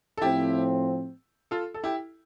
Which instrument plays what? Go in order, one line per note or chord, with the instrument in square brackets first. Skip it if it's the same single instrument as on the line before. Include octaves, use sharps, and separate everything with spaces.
[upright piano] A4
[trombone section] A2 F3 C4 [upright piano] E4 G4
[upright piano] F4 A4
A4
E4 G4